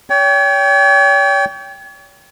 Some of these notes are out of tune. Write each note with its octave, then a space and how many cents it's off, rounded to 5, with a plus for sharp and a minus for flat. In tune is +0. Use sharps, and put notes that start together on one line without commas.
C#5 +40 G5 +0